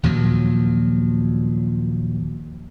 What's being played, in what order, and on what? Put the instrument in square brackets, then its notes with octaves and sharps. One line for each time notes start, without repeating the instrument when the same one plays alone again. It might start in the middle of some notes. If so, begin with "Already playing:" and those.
[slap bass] D#2 A#2 F3 F#3